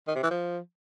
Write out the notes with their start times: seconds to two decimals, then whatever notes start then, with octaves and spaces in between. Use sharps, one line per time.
0.08 D#3
0.15 C3
0.23 E3
0.31 F3